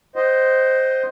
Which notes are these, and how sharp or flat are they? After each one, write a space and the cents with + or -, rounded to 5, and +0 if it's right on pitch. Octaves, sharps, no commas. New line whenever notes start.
C5 +0 D#5 +0 F#5 +35